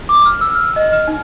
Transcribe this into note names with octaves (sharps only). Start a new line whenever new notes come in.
D6
F6
E6
F6
D#5
F6
D#4